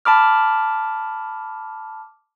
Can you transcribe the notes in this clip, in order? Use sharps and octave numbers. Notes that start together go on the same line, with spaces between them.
A5 B5 D6 F6